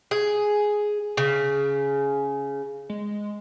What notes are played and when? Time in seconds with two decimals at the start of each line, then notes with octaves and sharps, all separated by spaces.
0.11 G#4
1.17 C#3
2.90 G#3